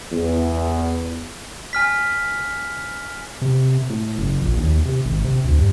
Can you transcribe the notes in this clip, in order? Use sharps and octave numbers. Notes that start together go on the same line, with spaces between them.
E2
G#5 F6 B6
C3
A2
F#1
A#1
D#2
C3
G#1
C3
D2
G2